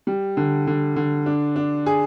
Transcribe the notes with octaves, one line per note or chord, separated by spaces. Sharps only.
G3
D3
D3
D3
D4
D4
G#4